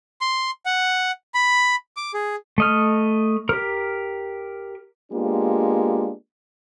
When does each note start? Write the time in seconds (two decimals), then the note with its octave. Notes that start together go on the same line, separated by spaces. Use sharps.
0.21 C6
0.66 F#5
1.34 B5
1.96 D6
2.14 G#4
2.58 A3 D#5 F6
3.49 G4 A#4
5.12 G#3 A#3 B3 D4 F4 G4